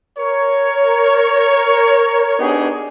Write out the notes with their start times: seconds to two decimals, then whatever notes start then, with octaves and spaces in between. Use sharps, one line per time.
0.19 A#4 C#5
2.39 B3 D4 D#4 G4 G#4